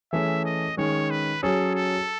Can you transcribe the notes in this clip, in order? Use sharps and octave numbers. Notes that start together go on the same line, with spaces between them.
E3 A3 C#4 G#4 E5
D#5
D#3 G#3 C#4 C#5
B4
F#3 C#4 G#4 A4
A4